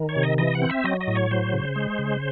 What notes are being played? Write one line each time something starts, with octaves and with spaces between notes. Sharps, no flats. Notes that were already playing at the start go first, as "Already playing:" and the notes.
Already playing: D#3
C#5
C3
D#5
E3 D#5
F#5
C4
E5
F#3 D#5
D#5
A2
C#5
F#3 C5
C#3
G#3
C#3